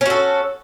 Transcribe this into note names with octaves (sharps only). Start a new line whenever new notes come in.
C#4 F#4 A4